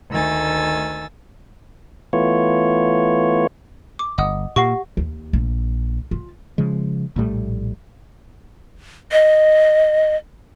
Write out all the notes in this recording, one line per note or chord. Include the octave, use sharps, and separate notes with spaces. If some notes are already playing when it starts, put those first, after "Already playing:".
D2 D#3 A3 G#5 E6 A6
E3 A3 B3 F4 C#5
D6
G1 D#5 F#5 D#6
A#2 A#3 G4 F#5 C#6 A#6 C7
D#2
A#1
F4
C#3 F3 G#3
A#1 A2 G3 A3
D#5